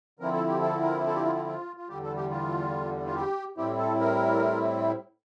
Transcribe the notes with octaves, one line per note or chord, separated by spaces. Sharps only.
D3 F3 C4 E4 A#4
A4
G4
A4
A#4
A4
G4
F4
F4
F4
F4
E2 D3 G3 G4
A4
G4
F4
F4
G4
A2 G3 C4 E4 G4
A4
A#4